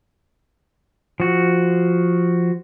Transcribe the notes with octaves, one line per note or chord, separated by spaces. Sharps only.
F3 F#4